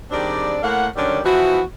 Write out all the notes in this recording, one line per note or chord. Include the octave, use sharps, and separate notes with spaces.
D#3 G3 C4 D4 G#4 D5
A2 A#3 F#5
D3 D#3 F#3 G3 C#4 D4
E3 F3 B3 E4 F#4